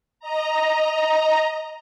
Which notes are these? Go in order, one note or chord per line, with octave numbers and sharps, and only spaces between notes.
D#5 A#5